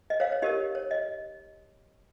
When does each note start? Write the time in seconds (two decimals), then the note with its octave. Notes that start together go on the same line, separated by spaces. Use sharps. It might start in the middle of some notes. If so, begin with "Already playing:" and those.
0.10 D#5
0.20 C#5 F5
0.32 C#5
0.42 D#4 G4 A#4 C#5 D#5
0.75 C#5
0.91 D#5